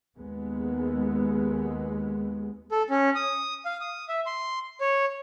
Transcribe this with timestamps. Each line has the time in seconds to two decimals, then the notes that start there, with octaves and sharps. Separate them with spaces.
0.17 D#2 G#3 B3
2.71 A4
2.90 C#4
3.15 D#6
3.65 F5
3.81 D#6
4.09 E5
4.26 C6
4.81 C#5